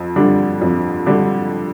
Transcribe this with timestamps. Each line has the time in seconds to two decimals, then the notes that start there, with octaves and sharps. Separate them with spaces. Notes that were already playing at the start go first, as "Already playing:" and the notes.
Already playing: F2
0.16 D3 G3 D4
0.61 F2
1.06 D3 G3 D4